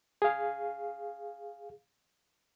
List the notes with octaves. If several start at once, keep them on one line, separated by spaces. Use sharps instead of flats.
G#4 F5